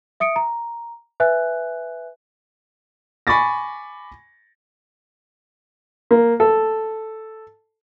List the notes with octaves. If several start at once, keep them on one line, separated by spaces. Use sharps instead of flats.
E5 D#6 C#7 D7
A#5
B4 E5 G#5 F#6
G#5 B5 C#6 D6 A6 A#6
A#3
A4